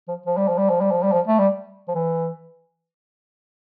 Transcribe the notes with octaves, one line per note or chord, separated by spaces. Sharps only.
F3
F3
G3
F3
G3
F3
G3
F3
G3
F3
A3
G3
F3
E3